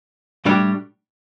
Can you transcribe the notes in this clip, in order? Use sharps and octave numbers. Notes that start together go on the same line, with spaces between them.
A2 G3 D4 G4